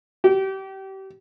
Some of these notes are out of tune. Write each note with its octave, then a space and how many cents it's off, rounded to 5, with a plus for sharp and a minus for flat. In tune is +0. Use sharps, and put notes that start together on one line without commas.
G4 -30